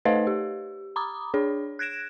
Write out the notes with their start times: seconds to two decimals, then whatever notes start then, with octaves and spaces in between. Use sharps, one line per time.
0.05 A3 D#4 B4 C5 D#5 F5
0.27 G4
0.96 A#5 B5 D6 D#6
1.34 D4 G#4 C#5
1.79 F#6 G#6 A#6 D7 E7